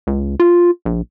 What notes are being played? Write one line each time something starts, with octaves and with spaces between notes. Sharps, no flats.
C#2
F4
A#1